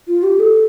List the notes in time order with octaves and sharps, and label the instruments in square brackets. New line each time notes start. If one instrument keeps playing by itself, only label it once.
[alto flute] F4
G4
A4